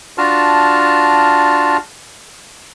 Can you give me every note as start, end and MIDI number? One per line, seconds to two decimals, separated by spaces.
0.18 1.77 62
0.18 1.77 65
0.18 1.77 66
0.18 1.77 81
0.18 1.77 89